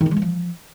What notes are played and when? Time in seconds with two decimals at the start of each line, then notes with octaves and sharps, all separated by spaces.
0.01 D#3
0.06 E4
0.11 G#3
0.17 E3
0.22 F3